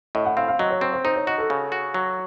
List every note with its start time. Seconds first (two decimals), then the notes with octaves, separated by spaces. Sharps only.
0.15 A2 D#5
0.26 F#5
0.37 C4 F5
0.48 F5
0.59 F#3 D#5
0.70 C#5
0.81 C4 C5
0.93 C5
1.04 D#4 C5
1.16 C#5
1.27 F#4 D#5
1.38 A4
1.50 C#3
1.72 F#4
1.94 F#3